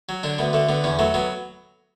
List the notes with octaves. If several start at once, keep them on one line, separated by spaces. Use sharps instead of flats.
F#3
D3 D4
D2 B3
D3 A3
D3 B3
E2 C#4
F#3 A3
F#3 B3